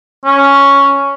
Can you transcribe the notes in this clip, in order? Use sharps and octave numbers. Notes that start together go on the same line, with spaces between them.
C#4